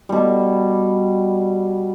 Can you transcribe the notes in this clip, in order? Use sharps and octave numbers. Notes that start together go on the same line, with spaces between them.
B2 G3